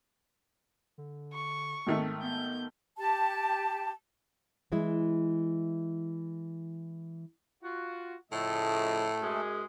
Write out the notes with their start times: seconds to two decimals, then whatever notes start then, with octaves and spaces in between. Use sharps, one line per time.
0.98 D3
1.33 C#6
1.87 G#1 D#3 A3 C4
2.22 B3 G6
2.97 G4 A5
4.72 E3 G#3 E4
7.63 F4 F#4
8.32 A2 C#3 F3 A3 A4 D#5
9.21 F#2 G#3 G#4